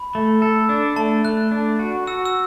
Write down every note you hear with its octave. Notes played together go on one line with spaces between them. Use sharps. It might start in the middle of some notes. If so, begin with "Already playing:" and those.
Already playing: B5
A3
A4
D4
A3 A5
A3 F#6
D4
F#4
F#4 E6
E6